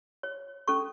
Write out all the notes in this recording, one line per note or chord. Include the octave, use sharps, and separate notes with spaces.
C#5
C#4 A4 C#6